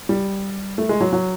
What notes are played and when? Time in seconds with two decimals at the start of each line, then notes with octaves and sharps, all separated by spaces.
0.09 G3
0.78 A3
0.89 G#3
1.01 F#3
1.13 F#3